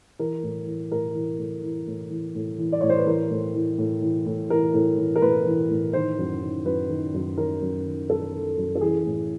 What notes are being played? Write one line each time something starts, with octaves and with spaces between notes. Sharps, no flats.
E3 A#4
A2
E3
A2 A#4
E3
A2
E3
A2
E3
A2
E3
D5
A2 C#5
C5
B4
E3 A#4
A2
E3
A2
E3
A2
E3 A#4
A2
E3
A#4
A2 B4
E3
A2
D#3 C5
F#2
D#3
F#2 B4
D#3
F#2
D#3 A#4
F#2
D#3
F#2 A4
D#3
F#2
A4
E3 G#4
A2